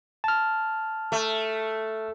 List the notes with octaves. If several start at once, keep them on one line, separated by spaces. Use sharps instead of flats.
A5 F6
A3